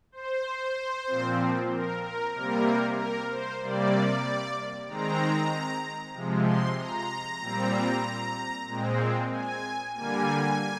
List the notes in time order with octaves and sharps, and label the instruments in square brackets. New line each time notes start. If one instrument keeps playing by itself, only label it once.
[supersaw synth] C5
A#2 F3 C4
A#4
A#4
C3 G3 A#3 A#4
A#4
C5
C3 G3 A#3 D5
D#3 G#3 C4 A#5
C3 F3 G#3
C6
A#5
A#2 G3 C4
A#2 G#3 C4
G#5
D3 G3 A#3 G#5